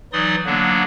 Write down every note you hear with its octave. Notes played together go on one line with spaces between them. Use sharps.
E3 F#3 D#4 D5 C6 D#6
D3 F#3 A#3 B3 D4